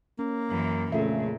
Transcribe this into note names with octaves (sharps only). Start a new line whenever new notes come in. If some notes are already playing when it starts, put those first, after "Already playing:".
A#3 C#4
F#2 E3
F2 A#2 C#3 A3 F4 E5